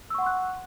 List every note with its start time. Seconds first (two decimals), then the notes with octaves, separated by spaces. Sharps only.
0.10 E6
0.14 C#6
0.18 F#5
0.22 C6
0.26 F#6